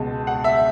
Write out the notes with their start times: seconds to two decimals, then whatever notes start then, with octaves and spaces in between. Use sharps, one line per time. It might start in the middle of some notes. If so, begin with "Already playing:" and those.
Already playing: C#2 B2 G#3 A5
0.27 F#5
0.44 E5